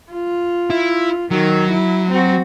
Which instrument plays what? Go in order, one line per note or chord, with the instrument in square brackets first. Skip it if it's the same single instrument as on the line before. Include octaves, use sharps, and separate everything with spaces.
[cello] F4
[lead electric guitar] E4
[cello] D#3 [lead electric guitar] F#3
[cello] E4
C4 F#4